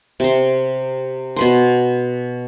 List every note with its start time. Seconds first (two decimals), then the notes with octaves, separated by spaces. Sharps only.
0.20 C3 C6
1.36 B2 B4 C6